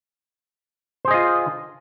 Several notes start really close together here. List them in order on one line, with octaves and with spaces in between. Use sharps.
C5 G#4 D#5 F4